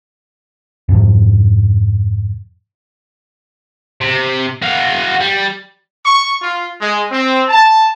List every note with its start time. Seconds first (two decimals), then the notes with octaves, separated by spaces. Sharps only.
0.89 F2 G#2 C3 F3
4.01 C3
4.62 F#4 F5
5.20 G3
6.05 C#6
6.42 F4
6.81 G#3
7.11 C4
7.49 A5